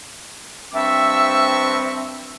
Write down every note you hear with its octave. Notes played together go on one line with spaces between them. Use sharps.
G2 C4 E5 C#6